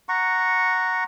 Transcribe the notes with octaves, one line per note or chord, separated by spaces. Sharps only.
F#5 A#5 C#6